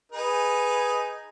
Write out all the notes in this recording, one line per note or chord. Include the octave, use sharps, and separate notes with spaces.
D#4 G#4 B4